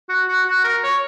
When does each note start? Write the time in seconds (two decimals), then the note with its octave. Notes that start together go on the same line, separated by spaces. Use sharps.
0.09 F#4
0.29 F#4
0.47 F#4
0.64 A#4
0.84 C#5